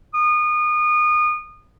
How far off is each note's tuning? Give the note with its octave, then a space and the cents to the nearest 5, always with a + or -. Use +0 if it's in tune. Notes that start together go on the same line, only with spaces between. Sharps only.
D#6 -30